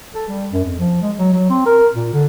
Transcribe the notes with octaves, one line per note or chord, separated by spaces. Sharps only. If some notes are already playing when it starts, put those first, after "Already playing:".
A4
G3
F#2
F2
F3
G#3
F#3
F#3
C4
A#4
A#2
D3